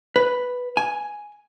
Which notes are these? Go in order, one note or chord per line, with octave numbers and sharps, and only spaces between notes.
B4
G#5